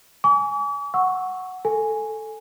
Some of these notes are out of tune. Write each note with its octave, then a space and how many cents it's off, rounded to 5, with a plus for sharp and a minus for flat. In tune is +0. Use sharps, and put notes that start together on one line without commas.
G#5 +0 D6 -45
F#5 +0 C#6 +0 E6 -10
A4 +0 G#5 +0